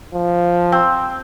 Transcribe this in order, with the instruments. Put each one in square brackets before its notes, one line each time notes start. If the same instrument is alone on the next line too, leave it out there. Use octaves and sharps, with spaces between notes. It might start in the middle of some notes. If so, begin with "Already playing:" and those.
[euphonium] F3
[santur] C4